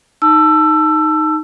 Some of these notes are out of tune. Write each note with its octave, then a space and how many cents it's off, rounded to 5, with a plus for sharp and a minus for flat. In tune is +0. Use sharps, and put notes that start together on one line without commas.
D#4 +0 A5 +0 E6 +20